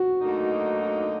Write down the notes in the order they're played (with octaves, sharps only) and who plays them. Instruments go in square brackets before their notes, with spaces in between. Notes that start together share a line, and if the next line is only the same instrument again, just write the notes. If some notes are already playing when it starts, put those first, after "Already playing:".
Already playing: [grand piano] F#4
[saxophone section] D2 D3 F#3 A#3 D#4